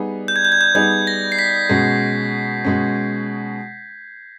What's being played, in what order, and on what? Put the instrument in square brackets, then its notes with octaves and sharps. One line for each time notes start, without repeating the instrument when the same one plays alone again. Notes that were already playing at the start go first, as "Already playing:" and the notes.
Already playing: [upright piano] G3 B3 D#4 G#4
[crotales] G6
G#6
G6
G#6
G6
[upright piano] G3 B3 D#4 G#4 [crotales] G#6
[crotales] A#6
C7
B6
[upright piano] B2 G#3 C#4
B2 G#3 C#4